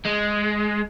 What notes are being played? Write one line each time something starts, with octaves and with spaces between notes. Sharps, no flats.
G#3